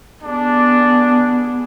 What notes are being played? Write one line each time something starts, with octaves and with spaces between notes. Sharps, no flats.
B3 D4 G#4